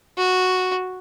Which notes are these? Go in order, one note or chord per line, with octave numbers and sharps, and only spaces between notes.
F#4